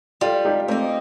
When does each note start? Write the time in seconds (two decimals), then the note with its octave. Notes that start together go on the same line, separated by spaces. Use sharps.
0.21 G3 F4 A4
0.45 D#4 G4
0.68 A3 A#3 C4 D#4